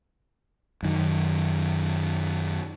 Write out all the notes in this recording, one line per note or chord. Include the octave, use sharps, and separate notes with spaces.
F#2 D#3